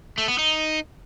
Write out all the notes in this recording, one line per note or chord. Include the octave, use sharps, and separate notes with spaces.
A3
B3
D#4